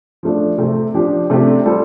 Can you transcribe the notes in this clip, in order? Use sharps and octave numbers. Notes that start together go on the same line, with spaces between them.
F3 A3 D4
C3 A3 C4
F3 D4 G4
C3 A3 D4 G4
G3 F4 A4